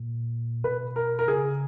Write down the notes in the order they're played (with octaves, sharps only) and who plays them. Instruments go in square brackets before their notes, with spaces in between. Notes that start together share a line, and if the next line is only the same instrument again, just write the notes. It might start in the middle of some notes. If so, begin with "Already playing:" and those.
Already playing: [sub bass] A#2
[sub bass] B2 [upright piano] B4
[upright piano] A#4
A#4
[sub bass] C#3 [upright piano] G#4